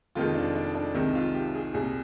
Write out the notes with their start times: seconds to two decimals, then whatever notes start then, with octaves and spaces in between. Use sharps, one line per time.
0.15 F1 F2 D#3 G#3 F4
0.35 D4
0.55 D4
0.75 D4
0.94 C2 C3 D#3 G#3
1.15 F4
1.34 G4
1.55 G#4
1.74 C2 A#2 G3 G#4